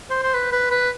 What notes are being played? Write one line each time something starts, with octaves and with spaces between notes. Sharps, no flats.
C5
C5
B4
B4
B4